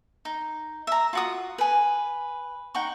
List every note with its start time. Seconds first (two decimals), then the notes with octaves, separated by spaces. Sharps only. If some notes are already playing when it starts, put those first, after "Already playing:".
0.25 D#4
0.87 E5 A#5
1.13 F4 F#4 D#6
1.58 B4 G#5
2.74 D#4 F#5 G5 C#6